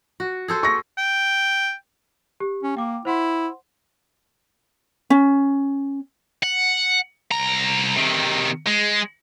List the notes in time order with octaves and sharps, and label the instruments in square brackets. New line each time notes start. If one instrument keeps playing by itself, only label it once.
[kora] F#4
G#4 A4 C5
[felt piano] C#6 A#6
[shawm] G5
[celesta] G4
[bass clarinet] C#4
[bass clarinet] A#3 [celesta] G5 D6
[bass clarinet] E4 [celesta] C5 F#5 C6
[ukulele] C#4
[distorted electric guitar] F#5
C2 A#5
C3 D#3
G#3